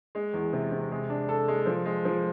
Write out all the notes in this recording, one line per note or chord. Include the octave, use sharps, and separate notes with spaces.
G#3
E2
C3
C3
G#3
D4
A4
G#3
F3
G#3
F3